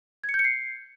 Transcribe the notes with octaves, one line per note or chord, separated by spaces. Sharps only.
G#6
C#7
G6
C#7
C7